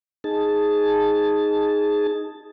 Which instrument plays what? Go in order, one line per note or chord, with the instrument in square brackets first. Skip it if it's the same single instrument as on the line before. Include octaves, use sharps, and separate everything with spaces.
[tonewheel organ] D#4 G#4 A5